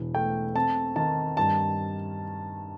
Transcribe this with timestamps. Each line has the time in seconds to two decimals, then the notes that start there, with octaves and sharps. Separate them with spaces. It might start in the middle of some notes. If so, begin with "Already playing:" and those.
Already playing: E1 E3
0.15 A3 G5
0.56 C4 A5
0.96 D#3 A5
1.37 G2 A5